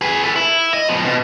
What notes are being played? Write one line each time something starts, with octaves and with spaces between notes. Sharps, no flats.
G#4 B4
A4 B4
E4
D#5
F3 B3
B2